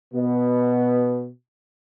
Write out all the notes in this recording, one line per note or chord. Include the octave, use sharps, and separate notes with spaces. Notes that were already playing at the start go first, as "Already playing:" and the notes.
B2 B3